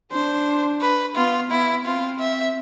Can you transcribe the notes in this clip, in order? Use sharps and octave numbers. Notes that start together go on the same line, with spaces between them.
D4 C5
B4
B3 F4
B3 E4
C4 F4
E5